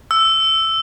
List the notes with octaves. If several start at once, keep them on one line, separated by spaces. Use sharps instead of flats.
E6